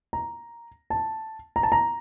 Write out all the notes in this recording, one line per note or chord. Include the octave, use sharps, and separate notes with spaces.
A#5
A5
A#5
A5
A#5